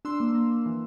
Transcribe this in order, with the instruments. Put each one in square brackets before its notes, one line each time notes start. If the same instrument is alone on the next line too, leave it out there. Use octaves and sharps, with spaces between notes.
[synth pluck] D4 C6 E6
A#3
A#3
A#3
E3